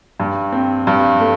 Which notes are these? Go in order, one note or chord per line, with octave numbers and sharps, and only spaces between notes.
G2
C4
G2
A3